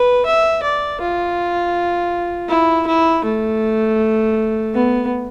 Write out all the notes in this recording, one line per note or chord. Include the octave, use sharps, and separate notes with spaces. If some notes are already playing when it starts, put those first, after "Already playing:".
Already playing: B4
E5
D5
F4
E4
E4
A3
B3